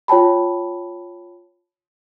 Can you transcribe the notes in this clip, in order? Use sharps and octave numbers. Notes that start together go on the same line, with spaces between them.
F4 C#5 G5 A5 B5